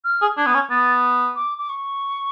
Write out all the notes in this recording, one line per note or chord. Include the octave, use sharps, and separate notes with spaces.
F6
G#4
D4 G#6
B3
C#4
B3 A6
D6
D6
C#6